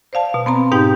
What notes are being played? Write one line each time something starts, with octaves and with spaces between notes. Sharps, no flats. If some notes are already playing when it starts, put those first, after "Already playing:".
C5 D5 F5 A5
B2
B3 C4 A#5
G#2 B2 D#4 G4 G5 G6